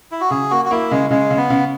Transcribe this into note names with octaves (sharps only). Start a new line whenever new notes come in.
E4
F#4
C#3 G#4
A#3 F#4
F#4
A#3 E4
C#3 G#3
C#3 G#3
C#3
B3
C#3